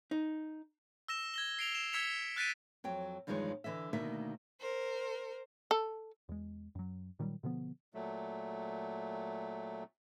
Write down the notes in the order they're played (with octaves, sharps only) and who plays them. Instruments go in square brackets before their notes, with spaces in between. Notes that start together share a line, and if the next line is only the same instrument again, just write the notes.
[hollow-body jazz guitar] D#4
[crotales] E6 A#6 E7
G#6 A#6 G7
C7 D7 F7
E7
E6 G#6 B6 C#7 E7 F7
F6 F#6 A6 B6 D7 D#7
[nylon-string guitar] F2 F#3 G5
E2 G2 D#3 F3 G#3 C#5
D3 E3 D#5 E5
D2 B2 D#3 A#3 E5
[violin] A#4 C5
[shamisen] A4
[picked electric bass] E2 G#3
F#2 F#3
A#2 D#3 F#3 G3
B2 D3 F3 B3
[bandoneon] A#2 F#3 A3